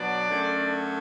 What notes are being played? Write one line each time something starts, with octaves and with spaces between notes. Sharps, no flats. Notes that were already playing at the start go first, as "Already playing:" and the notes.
Already playing: B2 F#3 B3 D4 D5
F#2 D3 A3 C#4